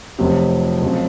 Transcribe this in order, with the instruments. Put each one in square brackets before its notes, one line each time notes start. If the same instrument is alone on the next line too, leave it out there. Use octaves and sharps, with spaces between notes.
[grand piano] F1 F2 C3 F#3
F2 C#3 F#3